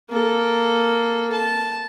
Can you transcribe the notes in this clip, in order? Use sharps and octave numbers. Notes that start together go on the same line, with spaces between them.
A#3 A4
A5